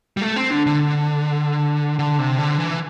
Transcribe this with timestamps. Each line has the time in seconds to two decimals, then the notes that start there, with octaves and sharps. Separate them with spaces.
0.17 G3
0.22 A3
0.36 C4
0.51 D3
0.66 D3
1.99 D3
2.19 C3
2.38 D3
2.58 E3